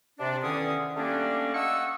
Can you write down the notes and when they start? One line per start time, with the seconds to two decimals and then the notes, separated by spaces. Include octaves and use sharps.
0.20 C3 D4
0.43 E2 D3 D#3 C#4 G#4 D#6
0.96 G3 A3 A#3 C#4 D4
1.54 D#5 F5 F#5 C#6 D#6 E6